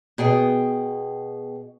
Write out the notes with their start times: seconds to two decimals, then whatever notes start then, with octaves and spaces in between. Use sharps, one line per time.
0.18 B2 G#4 G5